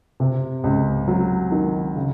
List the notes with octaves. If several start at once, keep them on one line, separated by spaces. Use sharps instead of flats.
C3
C#2
F#3
D#3
C#3